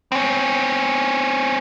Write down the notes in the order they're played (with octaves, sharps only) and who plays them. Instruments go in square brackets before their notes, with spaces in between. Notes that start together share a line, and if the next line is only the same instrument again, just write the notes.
[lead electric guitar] C4 C#4